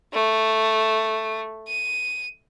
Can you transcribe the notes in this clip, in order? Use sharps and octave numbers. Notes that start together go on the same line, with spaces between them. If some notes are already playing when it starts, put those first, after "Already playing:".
A3
D#7